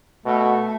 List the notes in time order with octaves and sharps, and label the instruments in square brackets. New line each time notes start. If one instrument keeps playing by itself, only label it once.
[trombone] B2 [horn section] A3